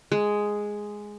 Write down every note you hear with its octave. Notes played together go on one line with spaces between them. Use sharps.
G#3